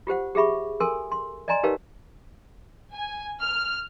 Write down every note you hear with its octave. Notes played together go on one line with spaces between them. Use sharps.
F4 G4 C5 F#5
G4 G#4 E5 B5 C#6
A4 A#4 G#5 C6 E6
C6
D5 D#5 G#5 A#5 C6
D#4 G4 A#4 B4 C#5 F5
G#5
F6